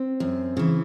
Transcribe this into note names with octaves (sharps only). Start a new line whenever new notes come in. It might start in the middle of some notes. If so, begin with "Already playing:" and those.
Already playing: C4
F#2
C#3 E3